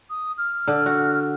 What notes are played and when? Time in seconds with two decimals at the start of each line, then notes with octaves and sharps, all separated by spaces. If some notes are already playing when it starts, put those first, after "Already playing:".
0.10 D#6
0.38 F6
0.68 D3
0.86 F#4